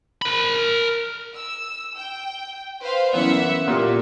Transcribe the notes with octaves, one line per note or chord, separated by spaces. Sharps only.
A#4 B5
E6
G5
B4 C5 F5
F#2 E3 B3 E5 F#5
A#2 A#3 G4